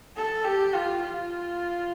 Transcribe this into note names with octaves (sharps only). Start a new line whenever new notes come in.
A4
G4
F4
F4